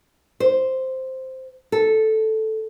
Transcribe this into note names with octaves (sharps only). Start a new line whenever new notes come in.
C5
A4